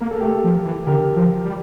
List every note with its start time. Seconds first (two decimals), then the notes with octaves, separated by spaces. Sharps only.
0.01 A#3 A#4
0.11 A4
0.21 A3 G4
0.31 A4
0.44 F3
0.65 E3
0.87 D3 G4 A#4
1.16 F3
1.44 G3